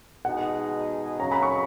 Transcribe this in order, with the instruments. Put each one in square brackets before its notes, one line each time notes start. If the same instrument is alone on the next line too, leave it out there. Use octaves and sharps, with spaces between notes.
[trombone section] B2 G#3 D#4 G#4 [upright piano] F#5
[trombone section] C#3 F#3 C#4 [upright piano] A#5
[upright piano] B5
C#6